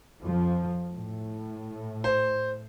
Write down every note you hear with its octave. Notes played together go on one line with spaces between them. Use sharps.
F2 F3
A2
C5